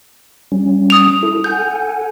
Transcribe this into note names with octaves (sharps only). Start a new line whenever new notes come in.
G3 C#4
D#6 F7
E4 A4
A4 F#5 G#5 G6